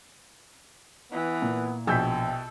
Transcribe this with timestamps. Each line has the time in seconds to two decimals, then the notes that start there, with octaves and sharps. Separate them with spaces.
1.12 E3 B3
1.42 A#2
1.87 A#1 B2 A4 G5 G#5 E6 G6 B6